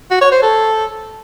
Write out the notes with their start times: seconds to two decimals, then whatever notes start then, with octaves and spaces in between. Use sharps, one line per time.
0.11 F#4
0.21 C#5
0.32 C5
0.42 A4